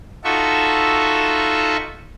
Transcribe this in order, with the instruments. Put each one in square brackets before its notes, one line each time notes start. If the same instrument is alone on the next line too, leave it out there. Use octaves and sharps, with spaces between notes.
[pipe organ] D#4 F4 F#4 A4 E5 C#6